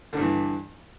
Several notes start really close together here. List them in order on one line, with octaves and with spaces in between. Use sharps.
D3 G2 E3